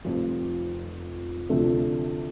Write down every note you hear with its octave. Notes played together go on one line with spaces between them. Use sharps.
F1 F2 F3
D2 C3 F3 A3 D4